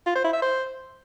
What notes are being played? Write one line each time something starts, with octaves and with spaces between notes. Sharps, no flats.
F4
C5
E4
E5
C5